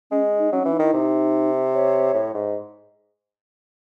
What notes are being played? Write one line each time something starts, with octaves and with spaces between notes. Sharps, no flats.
G#3 C#4
D#4
F#3 C#4
C#4
E3
D#4
D#3 E4
C3 D#4
C#5
A2
G#2